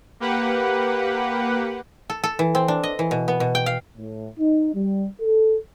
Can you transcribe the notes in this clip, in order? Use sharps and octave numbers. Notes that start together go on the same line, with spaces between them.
A#3 G4 B4 F#5
A4
A4
E3
C4
D4
D#5
E3
B2
B3
B2
G5
F5
A2
D#4
G3
A4